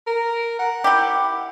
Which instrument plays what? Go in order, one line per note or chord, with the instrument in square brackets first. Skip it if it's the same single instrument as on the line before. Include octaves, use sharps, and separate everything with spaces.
[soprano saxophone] A#4
F#5
[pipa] E4 G4